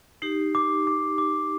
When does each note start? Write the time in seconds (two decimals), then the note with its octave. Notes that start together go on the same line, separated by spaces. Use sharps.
0.22 D#4 G4 C7
0.55 D6
0.87 D6
1.18 D6